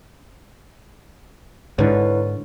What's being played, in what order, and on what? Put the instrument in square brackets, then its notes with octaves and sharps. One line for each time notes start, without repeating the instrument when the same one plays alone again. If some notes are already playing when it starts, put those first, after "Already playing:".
[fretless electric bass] G#2 D3 [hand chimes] E4 B4 C#5